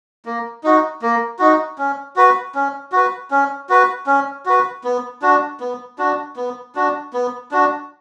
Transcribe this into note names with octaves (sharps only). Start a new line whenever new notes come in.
A#3
D#4 F#4
A#3
D#4 F#4
C#4
F#4 B4
C#4
F#4 B4
C#4
F#4 B4
C#4
F#4 B4
B3
D4 F#4
B3
D4 F#4
B3
D4 F#4
B3
D4 F#4